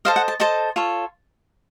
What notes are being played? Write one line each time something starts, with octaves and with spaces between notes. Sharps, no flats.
A4 C5 D#5 F5
F#5
A5
A4 C5 D#5 A5
F4 A4 C#5